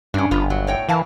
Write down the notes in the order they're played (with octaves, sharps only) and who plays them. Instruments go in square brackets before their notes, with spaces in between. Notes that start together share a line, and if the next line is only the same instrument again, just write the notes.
[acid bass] G2 [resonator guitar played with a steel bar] C#4 D4
[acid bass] G1 [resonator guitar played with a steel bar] B3 F4
[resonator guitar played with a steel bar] F#3
A2 C#5 G5
[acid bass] E3 [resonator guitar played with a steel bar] A#4 F5 A5